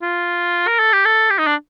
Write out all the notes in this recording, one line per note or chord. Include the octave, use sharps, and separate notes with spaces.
F4
A#4
A4
G4
A4
G4
D#4
D4